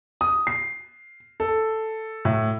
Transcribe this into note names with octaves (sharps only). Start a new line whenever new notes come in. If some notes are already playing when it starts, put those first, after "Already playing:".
D#6
C7
A4
A2